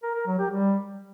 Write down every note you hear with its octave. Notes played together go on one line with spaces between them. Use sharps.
A#4
A#4
F#3
G4
G3